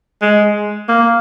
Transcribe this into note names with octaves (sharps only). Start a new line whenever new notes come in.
G#3
A#3